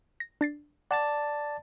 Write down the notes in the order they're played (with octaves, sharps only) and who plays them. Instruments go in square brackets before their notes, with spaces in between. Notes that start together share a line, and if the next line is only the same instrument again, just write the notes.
[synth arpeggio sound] A#6
D4 A6 C7
[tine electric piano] D5 A5 A6 [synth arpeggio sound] F#5